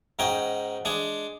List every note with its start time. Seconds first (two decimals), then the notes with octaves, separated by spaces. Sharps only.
0.19 G#2 C#4 D#4 F#4 G5
0.85 G#3 D4 G#4